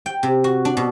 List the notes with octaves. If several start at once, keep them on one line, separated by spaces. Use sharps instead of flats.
G5
C3
F#4
D4
B2